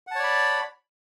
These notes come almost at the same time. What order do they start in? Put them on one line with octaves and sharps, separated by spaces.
F#5 A5 C#5 D5 B5